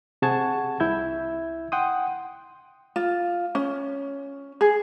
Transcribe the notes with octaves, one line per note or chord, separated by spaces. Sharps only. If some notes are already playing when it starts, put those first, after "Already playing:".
C3 G#4 F#5 A5 C#6 G#6
C2 E4 E5 G6 G#6
F#5 G5 C6 D#6
F4
C#4
G#4